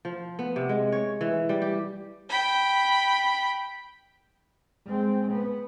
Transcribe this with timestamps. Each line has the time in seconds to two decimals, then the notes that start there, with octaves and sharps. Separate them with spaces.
0.05 F3
0.39 B3
0.56 C3
0.69 G#3
0.92 C#5
1.21 E3
1.49 G3
1.62 G4
2.29 G5 B5
4.85 G#3 C4
5.31 B3